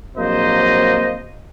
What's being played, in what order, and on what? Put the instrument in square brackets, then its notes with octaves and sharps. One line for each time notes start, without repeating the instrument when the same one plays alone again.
[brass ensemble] A#1 F#3 A#3 C4 C5 D#5